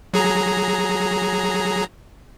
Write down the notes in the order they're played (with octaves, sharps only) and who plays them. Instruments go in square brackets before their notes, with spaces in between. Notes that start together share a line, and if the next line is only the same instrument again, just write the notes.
[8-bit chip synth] F#3 G#4 A#5